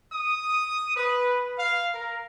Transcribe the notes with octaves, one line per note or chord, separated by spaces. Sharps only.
D#6
B4
F5
A#4